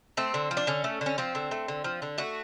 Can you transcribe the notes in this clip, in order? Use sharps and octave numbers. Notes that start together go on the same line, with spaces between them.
A3 C4
D3
F3
D4
D3 C#4
A3
D3 C#4
F3 C4
D3
A3
D3
F3
D3
A3 F#4